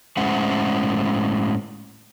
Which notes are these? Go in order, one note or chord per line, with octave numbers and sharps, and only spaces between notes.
A2 G#3 C#4 C5 E5 F#5